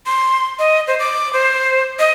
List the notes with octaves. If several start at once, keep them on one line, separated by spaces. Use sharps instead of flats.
C6
D#5
C5
D6
C5
D#5